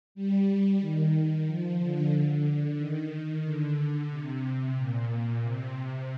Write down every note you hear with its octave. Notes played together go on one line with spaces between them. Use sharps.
G3
D#3
D#3
F3
D3
D3
D#3
D3
C3
A#2
A#2
C3